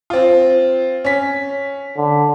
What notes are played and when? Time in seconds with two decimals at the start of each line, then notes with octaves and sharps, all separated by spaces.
0.10 C4 F4
1.04 C#4 B6
1.97 D3